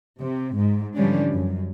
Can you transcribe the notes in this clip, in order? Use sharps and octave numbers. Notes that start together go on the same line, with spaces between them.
C3
G#2
D3 E3 F3 G3 C#4 D4
F#2